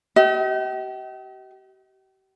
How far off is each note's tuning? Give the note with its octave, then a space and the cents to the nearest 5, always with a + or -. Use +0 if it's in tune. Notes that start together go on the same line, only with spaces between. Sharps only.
G4 -40 D#5 +40